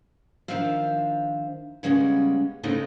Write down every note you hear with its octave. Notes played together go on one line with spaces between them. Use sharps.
D#3 F3 D4 C5 E5 F5
C#3 G3 G#3 A#3 B3 C#4
C#3 G#3 A3 C4 D#4 E4